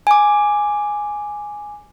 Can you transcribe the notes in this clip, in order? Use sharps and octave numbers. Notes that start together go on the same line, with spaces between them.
G#5 D6